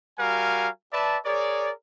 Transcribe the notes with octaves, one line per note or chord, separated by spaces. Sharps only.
G3 F#4 A#4 F5 G#5
B4 D5 E5 A5
G#4 A#4 C#5 D5